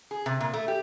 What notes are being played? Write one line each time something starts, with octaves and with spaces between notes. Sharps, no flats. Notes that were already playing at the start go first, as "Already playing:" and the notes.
G#4
C3
A#2
A3
G4